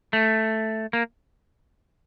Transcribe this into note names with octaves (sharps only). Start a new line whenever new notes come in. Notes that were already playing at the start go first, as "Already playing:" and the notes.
A3
A#3